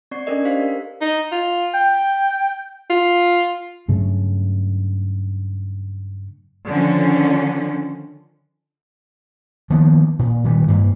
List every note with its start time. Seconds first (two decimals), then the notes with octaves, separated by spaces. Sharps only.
0.11 C4 D5 C#6 C7
0.27 C#4 D4 A4 A#4 D5 D#5
0.45 G4 C5 F5 B6
0.61 A#4
1.01 D#4
1.32 F4
1.74 G5
2.90 F4
3.88 G2 C#3 F#3 A3
6.67 D3 D#3 F3 C#4
9.70 D#3 F3 A#3 B3
10.19 A#2
10.44 A#2 D#3 E3 G3
10.68 G2 A#3